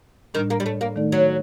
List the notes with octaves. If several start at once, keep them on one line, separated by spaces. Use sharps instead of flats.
A2 D#3 G3 D4
A#3
G3
A3
A#3
D#3 A3 D#4 A4 D5
F#3